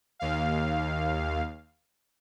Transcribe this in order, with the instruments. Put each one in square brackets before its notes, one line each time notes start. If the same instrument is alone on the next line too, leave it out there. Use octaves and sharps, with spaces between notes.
[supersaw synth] D#2 F5